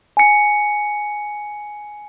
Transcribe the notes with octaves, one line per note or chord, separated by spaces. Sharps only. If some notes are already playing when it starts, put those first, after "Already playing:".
G#5 C#7